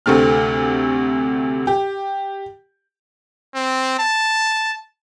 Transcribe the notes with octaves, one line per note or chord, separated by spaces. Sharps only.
D2 C3 A3 C4 F6
G4
C4
A5